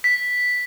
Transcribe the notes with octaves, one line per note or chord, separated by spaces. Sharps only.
B6